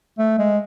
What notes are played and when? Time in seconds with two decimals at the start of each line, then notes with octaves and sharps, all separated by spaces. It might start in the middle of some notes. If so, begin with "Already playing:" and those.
0.19 A3
0.39 G#3